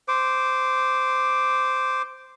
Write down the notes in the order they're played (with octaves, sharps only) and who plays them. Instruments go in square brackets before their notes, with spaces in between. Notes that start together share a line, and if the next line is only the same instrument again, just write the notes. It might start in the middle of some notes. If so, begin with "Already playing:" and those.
[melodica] C5 D6